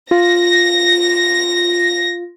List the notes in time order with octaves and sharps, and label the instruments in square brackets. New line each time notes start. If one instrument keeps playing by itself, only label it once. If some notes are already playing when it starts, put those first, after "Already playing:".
[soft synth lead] F4 [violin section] A#6